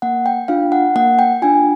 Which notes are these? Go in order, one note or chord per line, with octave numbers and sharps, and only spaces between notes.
A#3 F#5
G5
D4 F4 F5
F#5
A#3 F#5
G5
D4 F4 G#5